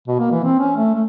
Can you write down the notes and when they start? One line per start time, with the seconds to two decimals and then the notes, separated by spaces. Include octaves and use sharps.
0.08 B2
0.19 A#3
0.32 E3
0.44 C4
0.59 C#4
0.77 A3
0.95 A3